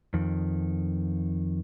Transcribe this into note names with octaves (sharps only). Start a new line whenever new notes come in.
F2 D#3